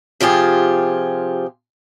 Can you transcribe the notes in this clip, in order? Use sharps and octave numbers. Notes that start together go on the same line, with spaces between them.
C3 F3 F4 G4 G#4